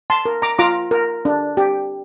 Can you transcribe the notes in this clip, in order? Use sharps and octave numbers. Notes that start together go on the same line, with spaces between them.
A5 C6
A#4
A#5 D6
F4 A#5 D6
A#4
D4
G4